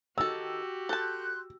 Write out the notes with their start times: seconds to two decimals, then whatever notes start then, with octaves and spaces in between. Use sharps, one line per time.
0.18 D#3 F#4 G4 A4 E6
0.89 A4 A5 C6 F#6 G6